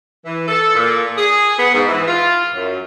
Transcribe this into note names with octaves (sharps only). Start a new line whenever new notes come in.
E3
A4
A#2
G#4
B3
G#2
E3
F4
F#2